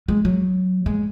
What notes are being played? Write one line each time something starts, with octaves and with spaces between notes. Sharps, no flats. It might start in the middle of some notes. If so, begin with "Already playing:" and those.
G#3
F#3
G#3